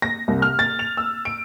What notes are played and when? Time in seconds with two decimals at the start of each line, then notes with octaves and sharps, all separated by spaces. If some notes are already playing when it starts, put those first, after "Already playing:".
0.02 A#6
0.28 C2
0.42 F6
0.59 A6
0.79 F7
0.97 E6
1.25 D7